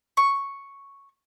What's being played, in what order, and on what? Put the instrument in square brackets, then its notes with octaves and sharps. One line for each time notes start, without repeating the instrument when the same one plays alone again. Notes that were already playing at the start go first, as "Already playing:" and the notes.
[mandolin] C#6